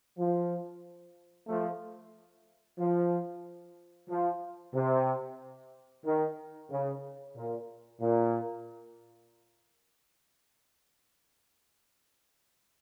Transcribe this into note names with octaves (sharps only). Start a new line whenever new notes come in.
F3
F3 A3
F3
F3
C3
D#3
C#3
A#2
A#2